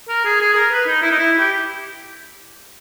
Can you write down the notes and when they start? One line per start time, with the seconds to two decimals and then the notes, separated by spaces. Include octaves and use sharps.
0.09 A#4
0.25 G#4
0.40 G#4
0.52 G#4
0.56 A#4
0.72 B4
0.87 D#4
1.02 E4
1.11 D#4
1.18 E4
1.39 G4